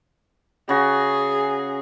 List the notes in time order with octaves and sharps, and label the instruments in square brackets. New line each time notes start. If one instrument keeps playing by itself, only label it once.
[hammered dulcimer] C#3 F#4 [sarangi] G#4